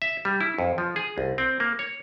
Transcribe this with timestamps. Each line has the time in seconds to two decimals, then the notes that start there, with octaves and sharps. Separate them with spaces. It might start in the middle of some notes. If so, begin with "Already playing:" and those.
0.02 E5
0.25 G3
0.41 E4
0.59 F2
0.78 F3
0.96 G#4
1.18 C2
1.38 C4
1.60 A#3
1.79 C#5